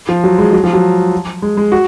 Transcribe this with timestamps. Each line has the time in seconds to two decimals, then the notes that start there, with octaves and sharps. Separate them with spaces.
0.09 F3
0.24 F#3
0.38 G#3
0.53 F#3
0.64 F3
0.73 F#3
1.42 G#3
1.57 G#3
1.72 F#4